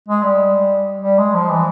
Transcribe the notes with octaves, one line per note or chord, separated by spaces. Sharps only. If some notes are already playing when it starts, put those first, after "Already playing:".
G#3
G3
G3
G#3
F3
E3